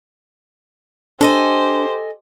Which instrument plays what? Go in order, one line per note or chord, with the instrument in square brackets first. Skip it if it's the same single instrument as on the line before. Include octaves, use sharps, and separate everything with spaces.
[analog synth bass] D4 [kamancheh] G4 C5 [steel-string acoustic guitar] A4 D#5 G#5